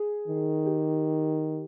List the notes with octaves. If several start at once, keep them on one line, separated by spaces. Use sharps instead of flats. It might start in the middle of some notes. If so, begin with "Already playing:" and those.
Already playing: G#4
D#3
G4